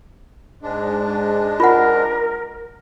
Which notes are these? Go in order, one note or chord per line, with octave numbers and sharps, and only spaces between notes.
G#2 G#3 D4
F4 A#4 F#5